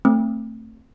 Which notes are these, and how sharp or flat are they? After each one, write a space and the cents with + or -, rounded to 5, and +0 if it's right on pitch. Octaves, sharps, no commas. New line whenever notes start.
A3 +25 C4 +15